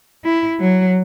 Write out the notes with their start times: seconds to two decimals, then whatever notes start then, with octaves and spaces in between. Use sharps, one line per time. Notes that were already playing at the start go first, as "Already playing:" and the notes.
0.25 E4
0.60 F#3